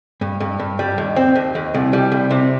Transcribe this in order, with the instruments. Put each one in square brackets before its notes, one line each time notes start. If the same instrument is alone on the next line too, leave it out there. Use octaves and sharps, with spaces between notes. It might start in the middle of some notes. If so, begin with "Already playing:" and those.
[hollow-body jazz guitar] G2
G2
G2
G3
D#2
C4
D#2
D#2
C2
G3
C2
C3